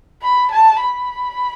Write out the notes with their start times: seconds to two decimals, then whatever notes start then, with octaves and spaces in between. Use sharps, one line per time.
0.22 B5
0.51 A5
0.81 B5